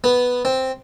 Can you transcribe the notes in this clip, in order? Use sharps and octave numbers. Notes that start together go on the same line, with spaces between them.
B3
C4